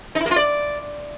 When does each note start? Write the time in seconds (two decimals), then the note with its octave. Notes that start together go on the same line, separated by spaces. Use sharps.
0.15 D#4
0.20 E4
0.26 A#3
0.31 F4
0.36 D5